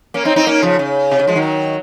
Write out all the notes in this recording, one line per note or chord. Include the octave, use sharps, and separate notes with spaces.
A#3 C#4
C4 D#4
C4 D#4
A#3 C#4
C#3 F3
C#3
C3
C#3
F3 G#3
D#3 F#3